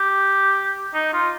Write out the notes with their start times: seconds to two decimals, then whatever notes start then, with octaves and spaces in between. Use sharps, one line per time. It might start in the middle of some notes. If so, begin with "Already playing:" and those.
Already playing: G4
0.94 D#4
1.14 F4